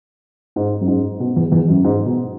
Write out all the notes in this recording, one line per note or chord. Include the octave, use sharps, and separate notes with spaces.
G#2
F#2
G#2
B2
E2
E2
F#2
G#2
B2